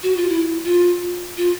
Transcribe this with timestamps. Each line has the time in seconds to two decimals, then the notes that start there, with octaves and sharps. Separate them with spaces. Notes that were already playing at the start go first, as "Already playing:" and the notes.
0.03 F#4
0.17 F4
0.29 E4
0.66 F4
1.37 F4